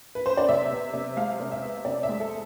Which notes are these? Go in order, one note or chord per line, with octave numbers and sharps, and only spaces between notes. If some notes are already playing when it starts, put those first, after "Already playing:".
B4
C5
D5
C3 E5
B3
C3
G#3 F5
C3
E5
B3
C3 D5
E5
G#3
A4